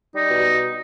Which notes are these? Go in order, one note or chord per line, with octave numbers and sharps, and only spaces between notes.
G3 D#4
B2